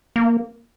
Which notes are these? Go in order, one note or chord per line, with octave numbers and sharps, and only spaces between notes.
A#3